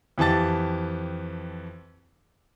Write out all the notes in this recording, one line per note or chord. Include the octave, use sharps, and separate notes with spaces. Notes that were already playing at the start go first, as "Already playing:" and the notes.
F2 E3 G4 A5 A6